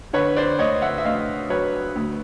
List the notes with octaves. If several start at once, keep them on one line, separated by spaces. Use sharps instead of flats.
D3 B4 C#5
C5 D5
D2 C#5 D#5
E5 F#5
E5
D2 D#5 F5
F#3 B4 C#5
D2